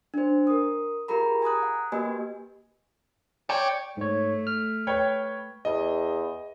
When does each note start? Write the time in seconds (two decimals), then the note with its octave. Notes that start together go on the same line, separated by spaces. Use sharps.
0.14 D4 C5
0.47 A#4 D#6
1.08 F4 G4 G#4 A#4 A#5 B5
1.42 G#5 A#5 D#6 F#6
1.63 F#5
1.92 A#3 F#4 G4 B4 D#5 G#5
3.49 C#5 D5 G5
3.97 G#2 A3 C#5
4.47 F6
4.87 B4 C#5 G5
5.65 E2 D#5